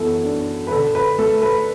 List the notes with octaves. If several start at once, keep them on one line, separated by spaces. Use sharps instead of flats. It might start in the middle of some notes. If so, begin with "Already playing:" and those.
Already playing: F#2 E3 B3 A4
D4
B4
D3 A4
B4
A3 A4
B4